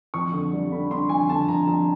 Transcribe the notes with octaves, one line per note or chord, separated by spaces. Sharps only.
F2 C#6
D3
G3
D3 B5
D3 C6
F2 G#5
D3 A5
F2 A#5
F2 A#5